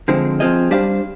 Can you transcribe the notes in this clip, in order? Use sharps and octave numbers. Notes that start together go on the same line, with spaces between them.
D3 F3 G#3 C4
F3 C4 F4 G#4 D#5
G3 D4 G4 C5 F5